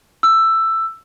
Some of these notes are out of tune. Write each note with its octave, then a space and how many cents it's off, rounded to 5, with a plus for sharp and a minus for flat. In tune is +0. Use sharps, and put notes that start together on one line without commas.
E6 +10